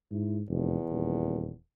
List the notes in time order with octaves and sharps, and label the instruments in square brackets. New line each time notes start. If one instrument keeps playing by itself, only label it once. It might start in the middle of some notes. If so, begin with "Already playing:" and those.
[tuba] G#2 [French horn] E4
[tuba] F1 [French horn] E2
[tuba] D#1